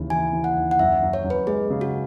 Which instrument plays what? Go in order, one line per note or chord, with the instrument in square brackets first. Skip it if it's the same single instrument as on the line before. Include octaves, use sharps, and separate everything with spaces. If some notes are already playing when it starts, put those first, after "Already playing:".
Already playing: [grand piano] D#2 C#3 E3
[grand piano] E3 [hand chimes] G#5
[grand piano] E3
[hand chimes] F#5
[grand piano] D#2
[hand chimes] F#5
[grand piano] F#2 [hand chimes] E5
[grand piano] F#2
[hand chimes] C#5
[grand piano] F#2
[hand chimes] B4
[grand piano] G#3 [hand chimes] G#4
[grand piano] C#3
[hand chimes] F#4